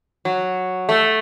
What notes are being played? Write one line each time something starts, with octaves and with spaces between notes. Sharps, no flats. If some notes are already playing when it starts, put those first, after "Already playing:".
F#3
A3